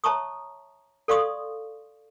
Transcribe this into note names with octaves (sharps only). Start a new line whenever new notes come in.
C#5 E5 A5 A#5 C#6 D#6
A4 D5 F5 C6 C#6 D#6